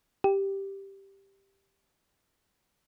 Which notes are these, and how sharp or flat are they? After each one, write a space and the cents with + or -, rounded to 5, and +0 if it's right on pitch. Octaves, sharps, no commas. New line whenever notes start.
G4 +0